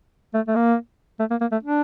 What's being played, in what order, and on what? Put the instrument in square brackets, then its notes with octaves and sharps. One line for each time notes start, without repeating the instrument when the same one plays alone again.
[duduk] A3
A3
A#3
A3
A#3
A#3
A3
D4